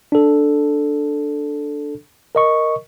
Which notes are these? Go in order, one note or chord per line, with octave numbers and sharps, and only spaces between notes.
D4 A4
A#4 D#5 C#6